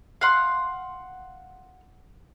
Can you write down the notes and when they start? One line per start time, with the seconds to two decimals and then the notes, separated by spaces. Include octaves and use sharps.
0.21 F5 F#5 C6